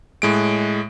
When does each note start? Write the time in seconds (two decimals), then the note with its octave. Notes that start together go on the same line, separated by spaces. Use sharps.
0.22 A2 G#3 D7